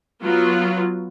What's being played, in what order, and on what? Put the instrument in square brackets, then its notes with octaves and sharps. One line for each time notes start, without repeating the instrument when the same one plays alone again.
[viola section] F#3 B3 F4